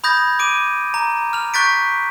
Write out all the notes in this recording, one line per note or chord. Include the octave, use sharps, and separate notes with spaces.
B5 D#6 G6 G#6 A#6
D6 D7 D#7
A#5
F6 F7
C#6 F#6 G6 A6 B6 D7